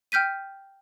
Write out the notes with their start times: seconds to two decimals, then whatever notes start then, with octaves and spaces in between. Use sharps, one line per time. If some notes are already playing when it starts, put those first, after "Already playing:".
0.12 G5 F6 G6 B6 D#7